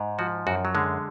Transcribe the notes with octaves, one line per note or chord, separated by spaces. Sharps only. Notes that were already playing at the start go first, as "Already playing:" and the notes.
Already playing: G#2
F3 F#4
F#2 F#4
F#3
D3 G#3